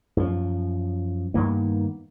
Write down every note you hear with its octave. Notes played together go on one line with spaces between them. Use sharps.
F#2 F3
G2 D#3 A#3 B3